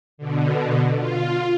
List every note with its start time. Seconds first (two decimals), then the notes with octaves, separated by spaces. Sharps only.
0.18 B2 D3
0.96 F4